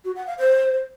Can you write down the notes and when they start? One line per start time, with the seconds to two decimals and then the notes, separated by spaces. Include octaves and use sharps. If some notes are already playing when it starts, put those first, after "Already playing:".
0.04 F#4
0.16 F#5
0.27 F5
0.38 C5